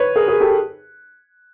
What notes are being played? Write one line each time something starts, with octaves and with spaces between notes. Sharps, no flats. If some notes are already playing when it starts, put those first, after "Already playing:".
Already playing: B4 C#5
G#4 A#4
G#4 A#4
G4 A4